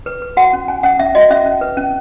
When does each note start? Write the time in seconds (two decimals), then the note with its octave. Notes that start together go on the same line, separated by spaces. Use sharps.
0.06 B4
0.22 B4
0.37 F#4 F#5
0.53 C#4
0.68 C#4 G#5
0.83 C#4 F#5
0.99 C#4 E5
1.15 F#4 D#5
1.30 C#4 E5
1.46 C#4
1.61 B4
1.77 C#4